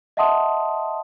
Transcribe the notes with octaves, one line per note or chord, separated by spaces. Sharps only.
D#5 E5 F#5 A5 C6 D#6